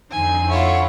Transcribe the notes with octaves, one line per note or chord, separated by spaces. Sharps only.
F2 D3 C4 D#4 G#5
E4 F4 A4 C#5 E5 F#5